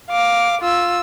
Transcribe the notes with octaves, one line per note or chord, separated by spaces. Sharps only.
F5 D6
F4 E6